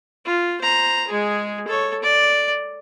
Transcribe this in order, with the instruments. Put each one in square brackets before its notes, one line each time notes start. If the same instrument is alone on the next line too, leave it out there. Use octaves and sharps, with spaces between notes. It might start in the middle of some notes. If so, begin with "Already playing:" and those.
[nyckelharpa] F4
C5 A#5
G#3 G#4
A4 C#5
D5